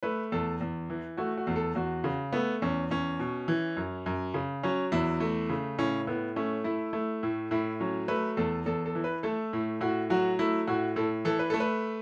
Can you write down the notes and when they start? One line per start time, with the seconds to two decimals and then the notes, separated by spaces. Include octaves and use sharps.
0.03 A3 B4
0.32 E2 A4
0.61 E2
0.90 E3
1.17 A3 F#4
1.37 F#4
1.47 E2
1.56 A4
1.75 E2 F#4
2.04 C#3
2.32 A3 B3
2.62 E2 C#4
2.91 E2 C#4
3.19 B2
3.48 E3
3.76 F#2
4.06 F#2
4.34 C#3
4.63 F#3 C#4
4.92 E2 E4
5.20 A3
5.49 C#3
5.78 A2 C#4
6.07 A2 B3
6.36 A3 C#4
6.64 A3 E4
6.93 A3
7.23 A2
7.51 A2 E4
7.80 F#3 C#4
8.08 A3 B4
8.37 E2 A4
8.66 E2 A4
8.86 A4
8.95 E3
9.04 B4
9.23 A3 A4
9.53 A2
9.81 A2 F#4
10.10 F#3 F#4
10.39 A3 E4
10.67 A2 F#4
10.96 A2 A4
11.25 E3 A4
11.39 B4
11.50 A3 A4
11.60 B4